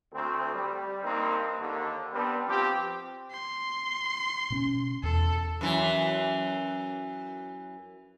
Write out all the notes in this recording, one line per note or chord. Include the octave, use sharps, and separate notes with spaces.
D2 C4
G3
G2 A#3 C4 D#4
D#2 D3
G3 B3 C4 D4
F3 C4 G4
C6
B2 C4 C#4
E2 A4
F#2 E3